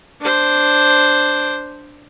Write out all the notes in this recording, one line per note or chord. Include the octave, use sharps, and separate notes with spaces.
D4 C5